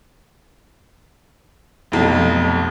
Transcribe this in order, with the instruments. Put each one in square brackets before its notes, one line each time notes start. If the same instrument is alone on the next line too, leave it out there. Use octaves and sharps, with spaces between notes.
[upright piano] F1 B1 F2